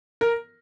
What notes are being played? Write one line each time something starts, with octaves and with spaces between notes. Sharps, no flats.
A#4